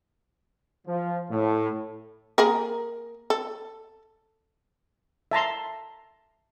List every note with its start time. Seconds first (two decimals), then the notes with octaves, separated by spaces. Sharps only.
0.87 F3
1.31 A2
2.38 A#3 G#4 A#4
3.30 A4
5.31 E5 A5 A#5 C6